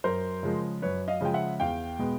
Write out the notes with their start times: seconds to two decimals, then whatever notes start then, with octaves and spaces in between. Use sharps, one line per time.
0.04 F#2 A#4 C5
0.43 C#3 F3 G#3
0.82 F#2 B4 C#5
1.08 D#5 F5
1.21 C#3 F3 G#3 G5
1.34 E5 F#5
1.60 E2 F5 G5
1.99 B2 G#3 B3